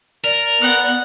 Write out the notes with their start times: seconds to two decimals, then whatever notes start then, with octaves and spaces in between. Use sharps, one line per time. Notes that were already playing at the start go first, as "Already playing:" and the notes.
0.24 A#4 D5
0.61 B3 F#5